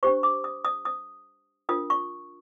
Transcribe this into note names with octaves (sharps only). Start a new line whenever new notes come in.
D4 G4 C5 C#6
D6
D#6
D#6
D#6
D4 F4 A#4 D#6
C#6